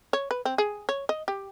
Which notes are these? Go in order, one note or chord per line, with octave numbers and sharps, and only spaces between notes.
C#5
B4
C4
G#4
C#5
D#5
G4